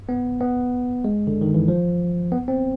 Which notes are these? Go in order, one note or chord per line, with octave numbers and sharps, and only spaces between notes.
B3
B3
G#3
D3
D#3
E3
F3
B3
C4